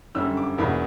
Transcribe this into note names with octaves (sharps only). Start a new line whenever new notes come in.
F#2 D3 G3 C#4 E6
D6
E2 B2 A#3 C#4 B5